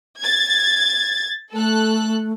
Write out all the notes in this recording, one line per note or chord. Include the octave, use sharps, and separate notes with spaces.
G#6 A6
A3 A4 F#6